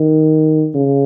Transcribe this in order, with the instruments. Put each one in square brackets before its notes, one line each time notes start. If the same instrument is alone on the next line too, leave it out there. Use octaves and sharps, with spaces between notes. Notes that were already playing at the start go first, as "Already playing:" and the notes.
Already playing: [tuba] D#3
C#3